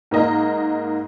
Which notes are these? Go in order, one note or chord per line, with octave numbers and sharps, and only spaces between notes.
G#2 A#3 D#5 A#5